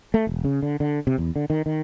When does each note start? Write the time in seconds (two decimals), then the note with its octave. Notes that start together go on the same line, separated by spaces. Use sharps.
0.14 A3
0.27 E1
0.45 C#3
0.63 D3
0.80 D3
1.07 C3
1.18 E2
1.36 D3
1.50 D#3
1.66 D#3